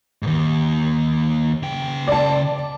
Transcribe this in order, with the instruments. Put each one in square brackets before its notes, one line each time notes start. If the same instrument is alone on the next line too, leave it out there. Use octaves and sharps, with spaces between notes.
[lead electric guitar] D#2 G#2
C#3 G5
[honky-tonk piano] D5 A5